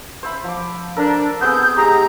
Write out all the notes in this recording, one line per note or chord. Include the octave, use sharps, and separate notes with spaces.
C5 E5 B5
F3 D6
D4 A4 A#4
B3 C4 G#4 G6
G#3 D#4 G4 A#5